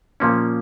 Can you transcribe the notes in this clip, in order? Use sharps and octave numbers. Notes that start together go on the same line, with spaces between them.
A#2 F3 A#3 C#4